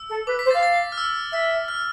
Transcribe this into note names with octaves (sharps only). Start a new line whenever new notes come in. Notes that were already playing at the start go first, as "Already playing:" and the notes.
Already playing: E6
A4
B4 D6
B6
C5
A6
F5
A6
F6
E6
E5 E6
F6